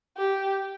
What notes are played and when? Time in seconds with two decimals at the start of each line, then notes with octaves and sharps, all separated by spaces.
0.18 G4